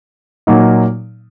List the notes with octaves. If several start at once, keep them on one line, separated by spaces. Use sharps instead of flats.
A#2 F#3 A#3 D#4